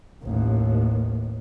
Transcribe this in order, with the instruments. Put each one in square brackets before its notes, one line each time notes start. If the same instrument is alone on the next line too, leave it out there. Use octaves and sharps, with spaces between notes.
[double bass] A1 D#2